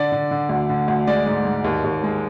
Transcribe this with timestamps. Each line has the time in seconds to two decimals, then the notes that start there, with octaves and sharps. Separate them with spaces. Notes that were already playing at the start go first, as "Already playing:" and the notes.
Already playing: D3 D5
0.12 D3
0.31 D3
0.49 D2
0.69 D3
0.88 D2
1.07 G#3 D5
1.26 G#2
1.45 G#2
1.64 D#2
1.84 D#2
2.04 G#3